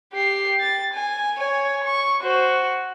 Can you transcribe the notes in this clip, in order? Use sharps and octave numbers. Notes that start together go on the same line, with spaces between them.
G4 C7
A6
G#5
C#5 G#5
C#6
F#4 C5